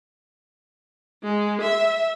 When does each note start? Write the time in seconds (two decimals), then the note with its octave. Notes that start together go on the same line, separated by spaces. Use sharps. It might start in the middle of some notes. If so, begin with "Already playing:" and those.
1.23 G#3
1.61 E5